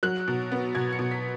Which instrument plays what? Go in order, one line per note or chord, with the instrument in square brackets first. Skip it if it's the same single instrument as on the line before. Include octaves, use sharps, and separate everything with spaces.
[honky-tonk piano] F#3 F#6
B2
B3
B2 G#6
C#7
B2
B6